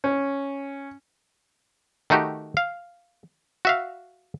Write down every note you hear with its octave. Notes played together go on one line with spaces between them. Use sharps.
C#4
D#3 A3 D#4 F#4 G4
F5
F#4 E5 F5